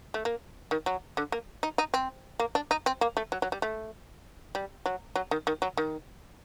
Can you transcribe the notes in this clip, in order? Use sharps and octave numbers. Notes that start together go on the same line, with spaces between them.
A3
A#3
D#3
F#3
D3
A#3
D#4
D#4
C4
A#3
D4
D#4
C4
A#3
A3
F#3
F#3
G3
A3
G3
F#3
F#3
D#3
D#3
F#3
D#3